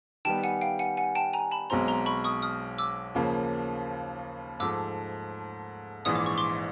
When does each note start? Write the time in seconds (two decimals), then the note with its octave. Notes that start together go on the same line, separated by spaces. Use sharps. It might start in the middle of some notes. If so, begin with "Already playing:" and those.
0.25 D#3 G3 B3 G5 A5
0.44 F#5 G#5
0.61 F5 G5
0.79 F#5 G#5
0.97 F#5 G#5
1.15 G5 A5
1.34 G#5 A#5
1.51 A5 B5
1.70 B1 B2 G#3 C4 A#5 C6
1.88 A#5 C6
2.06 B5 C#6
2.24 C#6 D#6
2.42 D#6 F6
2.78 D6 E6
3.15 D#2 C#3 F3 A#3
4.60 G#2 F3 A3 D6 E6
6.05 A#1 G#2 E3 D#6
6.16 D6
6.26 C#6
6.38 C6 D6